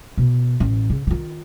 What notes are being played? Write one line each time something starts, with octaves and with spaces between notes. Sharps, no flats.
B2
A1
C#3
D#3 F4